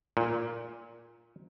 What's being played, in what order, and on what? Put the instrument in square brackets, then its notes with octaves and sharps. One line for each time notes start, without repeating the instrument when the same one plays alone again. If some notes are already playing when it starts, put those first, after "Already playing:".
[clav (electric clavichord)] A#2